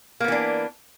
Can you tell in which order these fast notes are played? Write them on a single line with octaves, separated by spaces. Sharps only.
A#3 B3 E3 D4